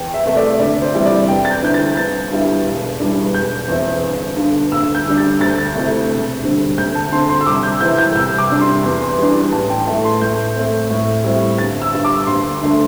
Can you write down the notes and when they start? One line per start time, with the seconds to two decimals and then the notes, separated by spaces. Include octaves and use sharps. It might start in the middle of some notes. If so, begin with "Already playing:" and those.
Already playing: E2 G5
0.14 E5
0.25 C3 A3
0.37 D5
0.60 D2 D5
0.82 C5
0.94 C3 E3 G3 E4
1.06 D5
1.28 E2 G5
1.45 A6
1.51 G6
1.63 D3 C4 E4 G6
1.74 A6
1.97 G1 A6
2.31 G2 G3 E4
2.66 E1
3.00 E2 E3 G3 D4
3.34 E1 G6
3.68 E2 E3 C4 E4
4.03 G1
4.37 G2 D3
4.72 D2 E6
4.95 G6
5.06 D3 G3 D4
5.18 A6
5.40 D2 A6
5.49 G6
5.58 A6
5.75 C3 A3 E4
6.09 E1
6.43 D2 D3 G3 C4
6.78 D2 G6
6.95 A5
7.12 D3 C4 C6
7.29 C6
7.41 E6
7.47 C2 D6
7.63 G6
7.81 C3 E3 C4 E4 G6
7.98 G6
8.15 C2 E6
8.38 D6
8.50 C3 G3 D4
8.61 C6
8.84 E2
9.18 E3 G3 D4
9.52 A1 A5
9.70 G5
9.87 A2 A3 E4 A5
10.05 C6
10.22 A2 G6
10.56 A3 C4
10.90 A2
11.24 G3 C4 E4
11.58 G1 A6
11.82 E6
11.93 G2 G3
12.05 D6
12.27 D2 C6
12.61 D3 A3 D4